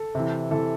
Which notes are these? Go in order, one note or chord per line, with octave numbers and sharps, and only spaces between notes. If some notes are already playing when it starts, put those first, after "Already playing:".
Already playing: A4
C3 E3
C3 E3 A4